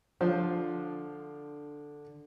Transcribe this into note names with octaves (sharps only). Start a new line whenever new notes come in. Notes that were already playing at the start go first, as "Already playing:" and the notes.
D3 F3 D4 C5